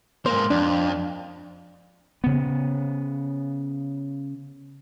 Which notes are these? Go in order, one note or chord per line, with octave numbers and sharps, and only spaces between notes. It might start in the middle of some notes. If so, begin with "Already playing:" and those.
G#2 A#3 C5
F2 D4
C#3 B3